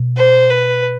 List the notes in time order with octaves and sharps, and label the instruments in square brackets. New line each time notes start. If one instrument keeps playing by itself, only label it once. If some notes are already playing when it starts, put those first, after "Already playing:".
Already playing: [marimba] B2
[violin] C5
B4